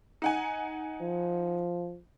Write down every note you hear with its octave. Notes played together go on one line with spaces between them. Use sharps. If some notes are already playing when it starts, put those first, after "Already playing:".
D#4 F#5 G#5
F3